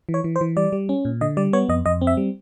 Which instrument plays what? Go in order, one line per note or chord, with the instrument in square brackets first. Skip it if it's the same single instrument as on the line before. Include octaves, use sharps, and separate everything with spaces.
[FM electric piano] E3
C#5
E3
C5
E3
G3 D5
G3
C#4
A#2
D3 D#5
G3 D5
B3 C#5
F2 D#5
F2 D#5
C4
E5
G3